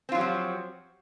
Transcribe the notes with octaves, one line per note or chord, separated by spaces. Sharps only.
F3 F#3 C4 F4 G4